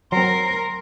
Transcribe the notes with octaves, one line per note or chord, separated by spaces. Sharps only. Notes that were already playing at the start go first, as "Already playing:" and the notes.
F#3 C4 A#4 C6